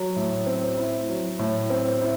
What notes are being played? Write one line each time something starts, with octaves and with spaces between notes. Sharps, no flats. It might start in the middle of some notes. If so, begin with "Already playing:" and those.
Already playing: F#3
A2
C4
E4
F#3
A2
C4
E4